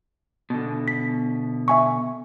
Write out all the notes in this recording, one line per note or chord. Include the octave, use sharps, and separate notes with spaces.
B2 D3
B6
E5 G#5 C#6